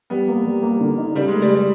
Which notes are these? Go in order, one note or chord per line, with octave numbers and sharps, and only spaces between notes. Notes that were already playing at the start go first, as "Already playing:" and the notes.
G3 B3
A#3
G3
A#3
D3
D#4
C#3 G3
G#3
A3
G3
G3